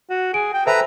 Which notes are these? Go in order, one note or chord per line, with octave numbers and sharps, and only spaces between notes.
F#4
G#4 D7
G5
A4 B4 C5 E5 G5 A#5